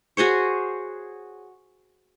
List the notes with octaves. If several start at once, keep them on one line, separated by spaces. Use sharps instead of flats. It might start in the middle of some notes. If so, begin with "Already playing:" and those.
F#4 G#4 C5 C#5